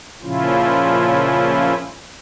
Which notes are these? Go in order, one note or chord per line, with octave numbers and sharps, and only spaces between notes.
A#2 C#3 F3 C#4 E4 F4